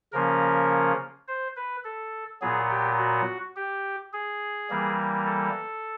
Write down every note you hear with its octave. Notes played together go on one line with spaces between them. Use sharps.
C#3 F3 A#3 C#4 A#4
C5
B4
A4
A#2 F#3 B3 G#4
G4
F#4
G4
G#4
E3 G3 A#3
A4